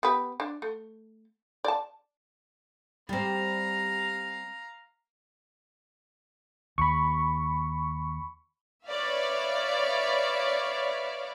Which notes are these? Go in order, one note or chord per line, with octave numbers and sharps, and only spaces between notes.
B3 G4 B4
D4
A3
D5 A5
G3 C4 F5 A#5
D#2 B5 C#6
B4 C#5 D5 E5 F5